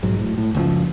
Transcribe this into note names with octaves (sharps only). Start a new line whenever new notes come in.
B1 G#2 F#3
A2
A2
F#1 C#2 A#2 F3